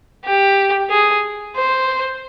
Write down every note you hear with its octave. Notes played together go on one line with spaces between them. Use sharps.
G4
G#4
C5